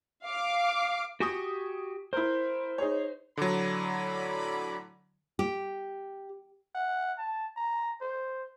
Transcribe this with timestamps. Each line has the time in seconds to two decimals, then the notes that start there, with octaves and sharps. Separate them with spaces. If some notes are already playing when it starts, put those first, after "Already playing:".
0.25 F5 D6
1.20 F#4 G4 G#5 C#6 D#6
2.13 E4 A#4 C5
2.78 D#4 G#4 C#5
3.37 A2 D3 F#3 D5 B5
5.39 G4
6.75 F#5
7.18 A5
7.57 A#5
8.02 C5